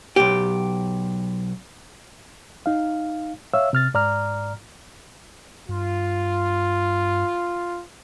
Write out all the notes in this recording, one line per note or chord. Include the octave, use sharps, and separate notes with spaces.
B1 G4
D#4 F5
C#5 E5 F5 E6
C3 F6 A6
G#2 D5 A#5 F6
G2 F4